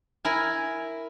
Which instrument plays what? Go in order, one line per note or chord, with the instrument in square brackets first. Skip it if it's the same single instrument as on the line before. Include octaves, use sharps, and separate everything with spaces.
[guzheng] E4 A#4 G#5